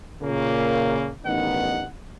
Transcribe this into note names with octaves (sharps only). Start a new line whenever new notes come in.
A#2 C#3 A#3
A1 G2 D#3 B3 D#4 F#5